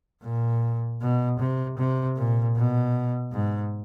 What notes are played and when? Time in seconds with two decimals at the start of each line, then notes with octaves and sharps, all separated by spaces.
0.23 A#2
1.02 B2
1.40 C3
1.78 C3
2.17 A#2
2.56 B2
3.33 G#2